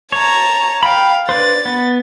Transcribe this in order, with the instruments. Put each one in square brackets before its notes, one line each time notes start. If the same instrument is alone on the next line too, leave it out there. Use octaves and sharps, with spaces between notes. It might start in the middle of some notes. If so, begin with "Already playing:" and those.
[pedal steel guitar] C#5 [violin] A5 A#5
[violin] F5 [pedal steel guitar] G5 B5
[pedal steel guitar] D4 B4 C5 [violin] A6
[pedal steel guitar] B3